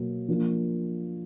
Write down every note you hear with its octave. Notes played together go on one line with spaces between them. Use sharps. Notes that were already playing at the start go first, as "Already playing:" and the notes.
Already playing: B2 F#3 A#3
F3 A#3 D4